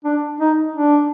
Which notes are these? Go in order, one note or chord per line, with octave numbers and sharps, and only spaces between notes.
D4
D#4
D4